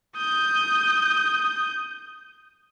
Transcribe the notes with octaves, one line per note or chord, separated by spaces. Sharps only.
D#6 G6